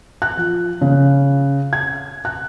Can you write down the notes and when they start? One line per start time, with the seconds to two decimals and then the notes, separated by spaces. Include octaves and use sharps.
0.22 F#6
0.37 F3
0.81 C#3
1.73 G#6
2.25 F#6